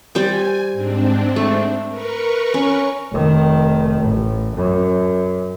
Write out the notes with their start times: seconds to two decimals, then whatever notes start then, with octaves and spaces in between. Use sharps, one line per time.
0.15 G3 C5 G5 G#5
0.72 G#2 C4 D4
1.36 A3
1.88 A#4 B4 C#6
2.54 C#4
3.11 F1 D#3
4.00 A1
4.56 F#2